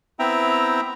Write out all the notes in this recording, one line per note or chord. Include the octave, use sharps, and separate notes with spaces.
B3 C4 E4 E5 G5 A#5